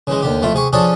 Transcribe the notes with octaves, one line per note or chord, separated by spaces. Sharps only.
C#3 E3 G#3
D#2 D3 G4
F2 A3 E4 F4
C3 G#4 C#6
F3 C#4 D4 G#4 A4